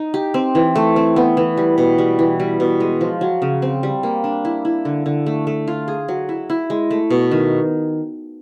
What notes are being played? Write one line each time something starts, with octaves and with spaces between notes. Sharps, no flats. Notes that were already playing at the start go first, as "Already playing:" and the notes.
Already playing: D#4
G4
C4
E3
A3
C4
B3
E3
G3
B2
G3
E3
G3
B2
G#3
F3
F#3
C#3
C4
G3
A#3
D4
E4
E4
D3
D3
A3
A3
F4
G#4
F#3
E4
E4
G#3
A3
B2
D#3